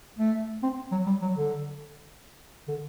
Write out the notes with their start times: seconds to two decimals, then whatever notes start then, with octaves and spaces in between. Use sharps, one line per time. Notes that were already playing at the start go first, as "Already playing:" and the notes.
0.18 A3
0.63 C4
0.92 F#3
1.06 G3
1.22 F#3
1.36 D3
2.68 D3